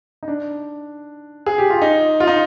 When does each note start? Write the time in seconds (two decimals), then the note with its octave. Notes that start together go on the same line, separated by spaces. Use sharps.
0.23 D#4
0.28 D4
1.46 G#4
1.58 G4
1.70 F4
1.82 D#4
2.20 F4
2.27 D#4